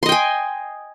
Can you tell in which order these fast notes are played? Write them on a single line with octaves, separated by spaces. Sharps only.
C6 D#5 G5 G#5